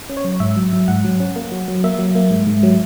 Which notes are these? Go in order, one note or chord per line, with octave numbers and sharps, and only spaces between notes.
C#4
C#5
F#3
G#2 E5
F#3
F#3
G#2 F#5
F#3
C#4
A#3
F#3
F#3
A#3 E5
F#3
A#3
G#2
G#2
F#3